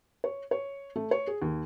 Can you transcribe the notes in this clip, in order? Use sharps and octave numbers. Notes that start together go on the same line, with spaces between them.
C#5
C#5
A3
C#5
G#4
D#2